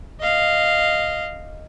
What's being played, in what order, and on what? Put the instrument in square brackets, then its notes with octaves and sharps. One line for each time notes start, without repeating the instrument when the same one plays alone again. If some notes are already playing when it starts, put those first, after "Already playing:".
[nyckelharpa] D#5 F5